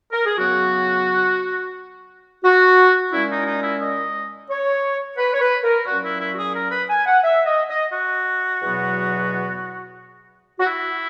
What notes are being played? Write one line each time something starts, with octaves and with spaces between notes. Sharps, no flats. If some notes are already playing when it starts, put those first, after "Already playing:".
A#4
G#4
C#3 F#3 B3 F#4
F#4
A#2 G#3 C#4 E4
D#4
D#4
E4
D#5
C#5
B4
C#5
B4
A#4
A#2 F#3 C#4 F#4
E4
E4
F#4
G#4
A#4
B4
G#5
F#5
E5
D#5
D#5
F#4
E2 B2 F#3 B3
F#4
E4